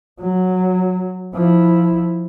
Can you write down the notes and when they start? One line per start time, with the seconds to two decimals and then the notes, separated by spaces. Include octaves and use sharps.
0.20 F#3
1.34 F3 E4